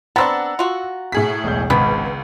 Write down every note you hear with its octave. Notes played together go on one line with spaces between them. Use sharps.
B3 C4 D4 F#5 A#5 E6 A6
F4 F#4
A2 G#4 B6
E1 B1 G6
G#1 C#2 B3